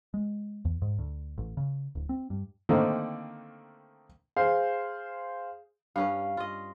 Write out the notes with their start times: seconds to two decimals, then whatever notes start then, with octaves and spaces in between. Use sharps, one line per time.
0.14 G#3
0.65 E2
0.82 G#2
0.99 D2
1.38 A1
1.57 C#3
1.95 D1
2.09 C4
2.30 G2
2.69 D3 D#3 A3 A#3 C4 D#4
4.37 G#4 C5 F5
5.96 G2 C#4 B4 F5
6.37 F4 D#5